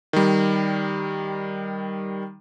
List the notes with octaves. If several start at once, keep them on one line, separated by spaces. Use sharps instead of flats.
D#3 G3